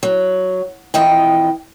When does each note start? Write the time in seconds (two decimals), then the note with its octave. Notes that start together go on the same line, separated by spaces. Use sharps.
0.03 F#3
0.94 F2 E3 D#5 G5